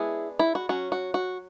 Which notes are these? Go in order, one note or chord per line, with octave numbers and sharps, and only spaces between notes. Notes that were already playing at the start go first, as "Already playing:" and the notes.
Already playing: G#3 B3 D4 E4 G#4
E4
F#4
F#3 C#4 F#4
F#4
F#4